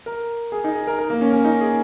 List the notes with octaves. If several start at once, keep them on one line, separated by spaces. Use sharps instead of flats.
A#4
G#4
D#4
G#4
A#4
A#4
A#3
C#4
C#4
D#4
G#4